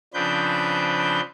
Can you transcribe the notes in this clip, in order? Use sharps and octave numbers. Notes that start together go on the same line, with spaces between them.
C#3 F3 C4 D4 B4 G6